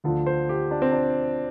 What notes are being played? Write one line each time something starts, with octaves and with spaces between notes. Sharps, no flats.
D2 D3 F3
C5
G4
D4
C4
D4